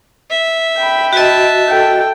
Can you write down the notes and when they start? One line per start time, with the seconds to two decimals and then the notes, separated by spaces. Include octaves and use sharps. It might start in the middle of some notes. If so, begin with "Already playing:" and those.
0.30 E5
0.78 G5 B5
1.13 F#4 D#5 E5 A5
1.68 A4 G5